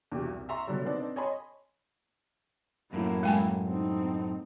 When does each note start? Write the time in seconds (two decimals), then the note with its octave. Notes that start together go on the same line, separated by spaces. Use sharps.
0.11 E2 B2 G4
0.26 C2
0.49 E5 A#5 C6 C#6
0.67 B2 D3 F#3 G3
0.85 B3 C4 D4 D#4
1.16 C#5 D#5 G#5 A5 B5 C6
2.93 F#2 A2 A#3 E4
3.23 G#3 G5 G#5
3.67 C4 D#4